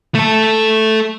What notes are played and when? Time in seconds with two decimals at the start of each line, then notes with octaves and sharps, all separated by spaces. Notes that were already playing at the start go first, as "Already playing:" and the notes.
0.15 A3 A4